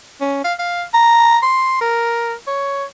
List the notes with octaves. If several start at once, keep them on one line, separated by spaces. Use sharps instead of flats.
C#4
F5
F5
A#5
C6
A#4
C#5